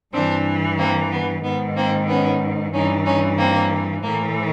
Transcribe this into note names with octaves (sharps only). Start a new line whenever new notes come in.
G2 E3 C4 D4
A#3 C4
B3
G#2 D#3 B3
A#3 C4
B3 C#4
G2 E3 C#4 D#4
C#4 D#4
A#3 C4
A2 E3 A#3